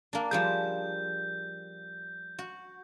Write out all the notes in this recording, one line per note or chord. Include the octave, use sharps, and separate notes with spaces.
A#3 D4
F3 G3 G#4 G6
F#4